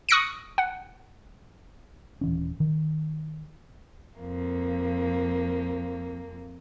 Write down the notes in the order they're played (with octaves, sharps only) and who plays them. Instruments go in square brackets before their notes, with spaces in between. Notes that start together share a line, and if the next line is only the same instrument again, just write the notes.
[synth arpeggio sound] C#6 D#6 F#6 A#6 C#7 D7
F#5
[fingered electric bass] D#1 E3 C#4
D#3
[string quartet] F2 A#3